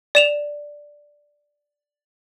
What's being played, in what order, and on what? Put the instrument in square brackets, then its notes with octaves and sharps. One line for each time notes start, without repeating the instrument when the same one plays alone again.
[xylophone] D5 E7 F7